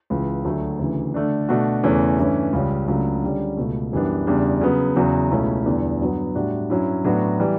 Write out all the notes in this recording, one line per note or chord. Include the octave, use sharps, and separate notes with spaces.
C#2 C#3 E3
D2 D3 F#3 A3
D2 C#3 E3
D3 A3 D4
B2 A3 D4 F#4
E2 C#3 E3 A3 C#4
G2 E3 A3 C#4
C#2 C#3 G3 C#4
C#2 C#3 F#3 A3 D4
D3 G3 C#4
C#2 B2 A3
F#2 E3 G3 B3 D4
E2 C#3 G3 D4
C#3 F#3 B3
E2 C#3 F#3
C#2 B2 A3 C#4 E4
E2 D3 G3 B3 E4
G2 F#3 B3 F#4
A2 G3 D4 F#4
G2 F#3 C#4 E4
A2 F#3 B3 D4 F#4
E3 G3